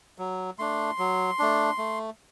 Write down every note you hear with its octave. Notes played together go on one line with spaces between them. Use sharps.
F#3
A3 D4 C6
F#3
A3 D4
A3